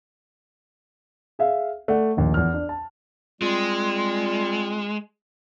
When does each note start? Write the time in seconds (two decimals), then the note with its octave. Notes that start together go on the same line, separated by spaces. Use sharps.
1.39 G#4 E5 F5
1.88 A3 D5 F#5
2.17 A#1 D#2
2.34 E2 F6
2.54 D4
2.69 A5
3.42 G3 G#3 C4 F4